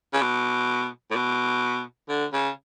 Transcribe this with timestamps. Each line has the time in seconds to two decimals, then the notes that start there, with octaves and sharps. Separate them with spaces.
0.13 C#3
0.22 B2
1.11 A2
1.16 B2
2.09 D3
2.33 C#3